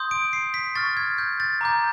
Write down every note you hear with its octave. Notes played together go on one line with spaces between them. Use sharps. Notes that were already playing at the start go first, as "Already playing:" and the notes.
Already playing: C6 D#6 G6
D7
C7
B6
C#6 F6 A6
G#6
G6
A6
A#5 D6 G6